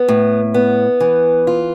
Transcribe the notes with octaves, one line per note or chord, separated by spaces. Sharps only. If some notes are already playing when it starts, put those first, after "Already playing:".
Already playing: B3
A2
B3
E3
F4